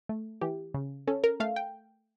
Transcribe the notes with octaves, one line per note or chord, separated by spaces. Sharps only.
A3
E3 G4
C#3
C#4 A4
A#4
A3 F5
G5